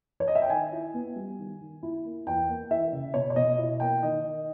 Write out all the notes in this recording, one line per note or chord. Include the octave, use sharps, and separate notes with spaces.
C#5
D#5
E5
G5
D#3 G#5
E4
B3
G3
D#3
D#3
E4
A#3
E2 G5
A#3
E3 E5
C#3
B2 C#5
C#5
B2 D#5
E4
A#3 G5
D#3 D#5
D#3